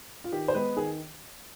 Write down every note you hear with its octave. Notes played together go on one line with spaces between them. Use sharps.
F4
D#3 G4
C5
G#3 B3 B4
D#3 G#4